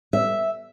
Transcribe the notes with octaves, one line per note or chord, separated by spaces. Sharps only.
E5